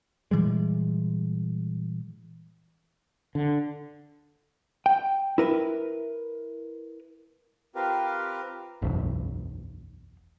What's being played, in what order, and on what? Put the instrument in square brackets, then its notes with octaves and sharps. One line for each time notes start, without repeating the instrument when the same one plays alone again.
[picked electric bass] A#2 E3 G3 G#3
[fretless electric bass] D3
[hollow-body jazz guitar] G5
E4 A#4 B4
[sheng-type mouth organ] C4 F4 G4 A#4 B4
[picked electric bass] F#1 B1 E2